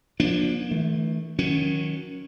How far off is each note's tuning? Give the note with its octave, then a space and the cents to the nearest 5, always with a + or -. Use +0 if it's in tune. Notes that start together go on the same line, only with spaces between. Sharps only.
F3 +25 A#3 +45 D4 +0
E3 -35 A3 +0
D#3 +20 F#3 -20 C#4 +0